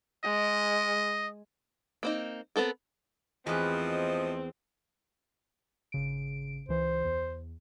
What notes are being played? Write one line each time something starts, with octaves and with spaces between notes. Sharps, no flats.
G#3 D#5
A#3 C4 D#4
B3 C4 A4 A#4
E2 F3 A3 C4 B4 D#5
G#1 C#3 D7
C#2 E3 C5
E2